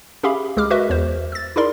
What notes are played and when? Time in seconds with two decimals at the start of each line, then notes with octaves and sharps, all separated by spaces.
0.23 C#4 G4 G#4 E5 F5 B5
0.56 C#2 G#3 G#4 D6 F6
0.70 F#4 A#4 B4 D#5 E5
0.90 E2 C5
1.32 E6 A6
1.56 D#4 E4 G#4 A#4 D5 C6